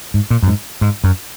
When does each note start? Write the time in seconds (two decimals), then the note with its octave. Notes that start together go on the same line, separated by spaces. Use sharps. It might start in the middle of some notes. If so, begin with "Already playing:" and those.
0.14 G#2
0.30 A#2
0.43 F#2
0.48 G#2
0.81 G#2
1.04 F#2